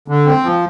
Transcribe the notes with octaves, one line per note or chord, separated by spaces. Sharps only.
D3
C4
F3